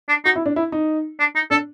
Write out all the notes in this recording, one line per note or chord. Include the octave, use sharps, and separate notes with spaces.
D4
D#4 F#4
E4
D4
E4
D#4
D4
D#4
D4 A4